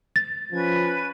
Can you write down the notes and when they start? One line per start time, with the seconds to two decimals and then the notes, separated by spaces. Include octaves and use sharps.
0.16 A6
0.52 F3 C#4 B4 G#6